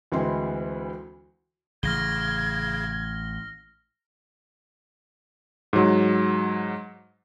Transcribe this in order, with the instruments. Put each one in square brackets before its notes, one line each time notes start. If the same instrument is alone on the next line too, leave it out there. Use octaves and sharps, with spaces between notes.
[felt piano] D2 E3 G#3 C4 E4 C6
[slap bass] A1 [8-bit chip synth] C#3 [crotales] F6 A#6 G7 [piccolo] G#6
[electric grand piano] G#2 F#3